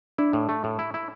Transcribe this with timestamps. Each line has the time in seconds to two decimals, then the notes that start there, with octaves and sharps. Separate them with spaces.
0.18 D4 E4
0.33 A2
0.49 A3
0.64 A2
0.79 E4
0.94 E4